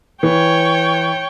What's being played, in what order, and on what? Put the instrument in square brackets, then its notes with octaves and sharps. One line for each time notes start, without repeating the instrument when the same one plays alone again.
[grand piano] E3 [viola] C#5 G5